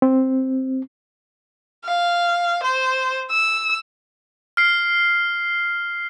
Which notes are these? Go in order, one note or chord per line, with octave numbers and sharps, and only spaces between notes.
C4
F5
C5
E6
F6 C7